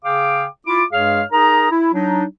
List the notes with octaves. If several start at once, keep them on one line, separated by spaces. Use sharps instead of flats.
C#3 G#4 F5 G5 D6
E4 F4 D6
G2 G#3 G#4 C#5 F5 F6
D#4 G#4 A#4 A#5
E4
F#3 D4 D#4